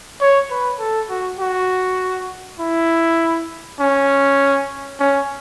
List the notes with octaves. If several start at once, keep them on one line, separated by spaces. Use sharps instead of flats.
C#5
B4
A4
F#4
F#4
E4
C#4
C#4